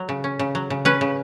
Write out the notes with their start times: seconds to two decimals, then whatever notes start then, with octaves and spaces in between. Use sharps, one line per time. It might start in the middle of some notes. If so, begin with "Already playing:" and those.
Already playing: F#3
0.09 C#3
0.24 C#4
0.39 C#3
0.55 F#3
0.70 C#3
0.85 C#4 B4
1.01 C#3